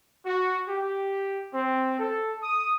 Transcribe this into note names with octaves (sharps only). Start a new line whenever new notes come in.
F#4
G4
C4
A4
D#6